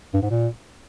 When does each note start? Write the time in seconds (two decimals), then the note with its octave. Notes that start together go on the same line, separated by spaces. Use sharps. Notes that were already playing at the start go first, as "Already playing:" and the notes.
0.14 G2
0.22 G#2
0.31 A#2